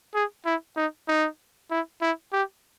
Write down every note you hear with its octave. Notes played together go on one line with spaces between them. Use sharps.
G#4
E4
D#4
D#4
E4
E4
G4